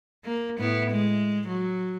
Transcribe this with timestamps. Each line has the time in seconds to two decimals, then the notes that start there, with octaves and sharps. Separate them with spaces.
0.24 A#3
0.58 A2 B3 E4
0.91 G#3
1.47 F#3